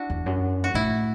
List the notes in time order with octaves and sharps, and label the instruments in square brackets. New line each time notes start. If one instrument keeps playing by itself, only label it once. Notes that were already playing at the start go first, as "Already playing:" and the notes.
Already playing: [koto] D4 E4 F#4
[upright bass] E2
F#2
[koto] F#4
[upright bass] A2 [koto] E4